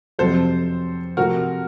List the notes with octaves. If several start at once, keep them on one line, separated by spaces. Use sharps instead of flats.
F2 C3 F#3 A4 C5
C3 F3 A3 C4 F#4 A#4